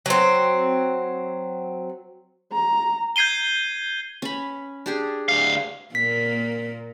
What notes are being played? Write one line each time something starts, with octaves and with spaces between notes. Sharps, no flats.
F#3 C4
A#5
G6 G#6 C7 D#7 G7
C#4 B5
D4 G4 G#4
D2 F5
A#2 A#3 B6